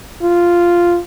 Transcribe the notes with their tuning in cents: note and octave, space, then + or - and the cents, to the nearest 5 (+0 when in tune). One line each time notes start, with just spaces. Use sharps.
F4 -5